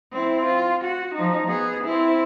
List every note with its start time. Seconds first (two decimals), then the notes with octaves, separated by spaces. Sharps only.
0.12 C4 E4
0.45 F4
0.84 F#4
1.15 F3 D#4
1.47 B3 G#4
1.84 C4 E4